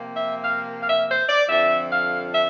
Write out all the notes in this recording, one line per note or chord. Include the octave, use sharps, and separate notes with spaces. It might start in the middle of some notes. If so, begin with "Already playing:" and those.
Already playing: C3 F3 A#3
E5
F5
F5
E5
C5
D5
F2 D3 F3 E5
F5
E5